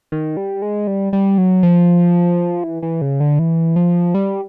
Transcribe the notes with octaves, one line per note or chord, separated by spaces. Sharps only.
D#3
G3
G#3
G3
G3
F#3
F3
E3
E3
C#3
D3
E3
F3
G3